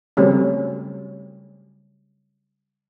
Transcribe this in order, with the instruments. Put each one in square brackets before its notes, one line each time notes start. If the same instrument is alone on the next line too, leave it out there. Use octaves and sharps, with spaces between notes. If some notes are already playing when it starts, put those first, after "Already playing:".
[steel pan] C#3 F#3 G3 A3 C4 C#4